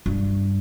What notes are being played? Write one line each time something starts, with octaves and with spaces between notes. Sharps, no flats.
G2